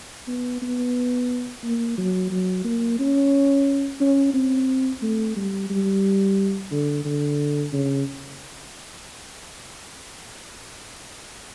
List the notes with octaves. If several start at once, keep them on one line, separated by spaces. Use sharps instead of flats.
B3
B3
A#3
F#3
F#3
A#3
C#4
C#4
C4
A3
G3
G3
D3
D3
C#3